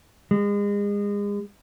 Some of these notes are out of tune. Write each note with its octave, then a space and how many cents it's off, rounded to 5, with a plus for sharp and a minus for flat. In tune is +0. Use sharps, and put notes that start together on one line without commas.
G#3 -35